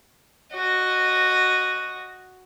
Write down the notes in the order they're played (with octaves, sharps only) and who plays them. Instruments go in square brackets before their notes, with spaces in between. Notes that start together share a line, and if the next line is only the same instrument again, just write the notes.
[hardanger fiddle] F#4 D#5